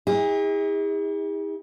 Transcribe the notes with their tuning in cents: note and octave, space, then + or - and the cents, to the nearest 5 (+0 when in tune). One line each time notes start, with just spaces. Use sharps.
E4 -45 G#4 -45 D#5 +35